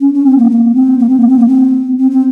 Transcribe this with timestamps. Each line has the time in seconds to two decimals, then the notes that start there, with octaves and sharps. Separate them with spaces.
0.01 C#4
0.14 C#4
0.26 C4
0.38 A#3
0.51 A#3
0.75 C4
0.99 A#3
1.09 C4
1.20 A#3
1.29 C4
1.39 A#3
1.49 C4
1.98 C4
2.11 C4